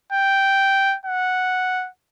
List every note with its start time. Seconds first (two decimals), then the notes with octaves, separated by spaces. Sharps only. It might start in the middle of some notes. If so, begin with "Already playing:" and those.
0.13 G5
1.06 F#5